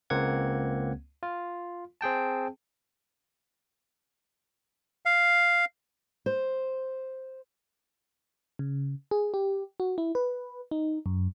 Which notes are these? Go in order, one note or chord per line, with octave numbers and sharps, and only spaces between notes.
C#2 A#3 C4 F#5 G#6
F4
C4 G#4 G5 A5
F5
C5
C#3
G#4
G4
F#4
E4
B4
D#4
F#2